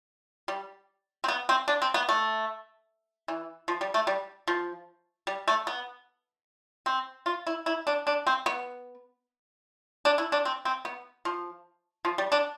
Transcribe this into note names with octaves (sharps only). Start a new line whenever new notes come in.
G3
C4
B3
C4
D4
C4
B3
A3
E3
F3
G3
A3
G3
F3
G3
A3
B3
C4
F4
E4
E4
D4
D4
C4
B3
D4
E4
D4
C4
C4
B3
F3
F3
G3
D4